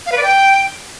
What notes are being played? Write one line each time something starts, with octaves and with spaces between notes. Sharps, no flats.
F5
B4
D5
G5